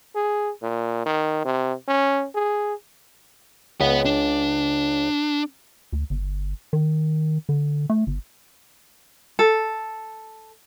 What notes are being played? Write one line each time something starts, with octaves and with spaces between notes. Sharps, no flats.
G#4
A#2
D#3
C3
C#4
G#4
C#2 B4 F#5
D4
D2
G1
D#3
D3
A3
G1
A4